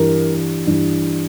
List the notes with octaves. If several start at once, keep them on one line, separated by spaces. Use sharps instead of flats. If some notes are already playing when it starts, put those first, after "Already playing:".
Already playing: G2 E3 A#4
G2 E3